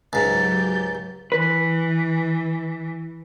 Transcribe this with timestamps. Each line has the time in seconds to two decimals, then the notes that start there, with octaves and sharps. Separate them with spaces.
0.13 C#2 G#2 F#3 G4 G6 A6
1.32 E3 B4